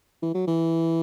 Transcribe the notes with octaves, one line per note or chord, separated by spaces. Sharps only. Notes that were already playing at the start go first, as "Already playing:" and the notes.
E3
F#3
E3